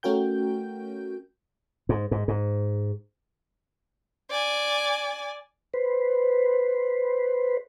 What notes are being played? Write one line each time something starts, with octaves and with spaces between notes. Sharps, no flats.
A3 C#4 F#4 A#4 G5 G6
G#2
G#2
G#2
D5 G#5
B4 C5